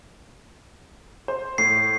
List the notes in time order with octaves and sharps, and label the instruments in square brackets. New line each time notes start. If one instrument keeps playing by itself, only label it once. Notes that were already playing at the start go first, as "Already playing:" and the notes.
[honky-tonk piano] C5
[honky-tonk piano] A2 [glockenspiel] C7